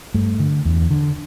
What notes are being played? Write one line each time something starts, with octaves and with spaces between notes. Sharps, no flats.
G2 A3
D3
E2
D3